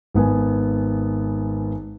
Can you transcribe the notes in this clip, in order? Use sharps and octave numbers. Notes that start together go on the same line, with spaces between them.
G#1 B3 G#5